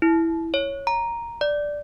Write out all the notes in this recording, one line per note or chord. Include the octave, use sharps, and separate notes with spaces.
E4
C#5
A#5
D5